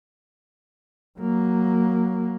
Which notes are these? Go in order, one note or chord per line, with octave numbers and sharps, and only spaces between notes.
F#3 A#3